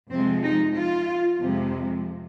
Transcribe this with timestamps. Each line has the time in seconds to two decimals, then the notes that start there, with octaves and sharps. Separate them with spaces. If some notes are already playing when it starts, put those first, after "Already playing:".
0.10 F2 C3 F3 G#3 C4
0.43 D#4
0.76 F4
1.40 F2 C3 F3 G#3